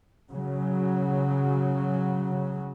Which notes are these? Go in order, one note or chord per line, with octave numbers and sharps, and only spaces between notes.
C#3 F#3